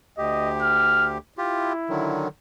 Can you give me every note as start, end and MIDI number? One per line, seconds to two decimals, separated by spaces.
0.18 1.18 38
0.18 1.18 67
0.18 0.50 75
0.62 1.08 89
1.38 2.27 64
1.38 1.73 65
1.38 1.73 67
1.89 2.28 50
1.89 2.28 51
1.89 2.28 54